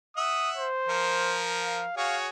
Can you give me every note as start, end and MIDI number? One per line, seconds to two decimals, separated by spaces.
0.17 0.66 76
0.17 0.66 78
0.17 0.50 87
0.57 1.48 72
0.88 1.84 53
0.88 1.84 70
1.64 1.93 77
1.97 2.29 66
1.97 2.29 68
1.97 2.29 73
1.97 2.17 77